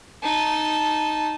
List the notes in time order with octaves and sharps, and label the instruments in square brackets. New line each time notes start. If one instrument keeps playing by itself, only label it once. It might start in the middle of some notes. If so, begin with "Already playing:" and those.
[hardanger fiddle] D#4 A5